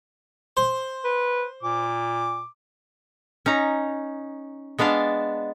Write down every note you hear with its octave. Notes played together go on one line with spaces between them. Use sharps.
C5
B4
A#2 D6
C#4 D#4 A#5
G#3 B3 D4 F5 A5